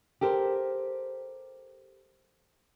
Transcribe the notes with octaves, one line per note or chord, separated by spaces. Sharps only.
G4 A4 A#4 C5